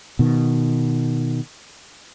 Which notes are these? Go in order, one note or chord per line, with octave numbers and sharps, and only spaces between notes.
B2 D#3